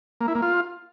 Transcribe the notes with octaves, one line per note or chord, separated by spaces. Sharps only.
A#3
E4
A#3
F4